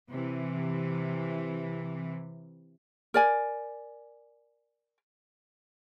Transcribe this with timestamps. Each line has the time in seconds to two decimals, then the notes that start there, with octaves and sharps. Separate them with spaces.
0.10 C3 E3
3.14 A#4 D5 G#5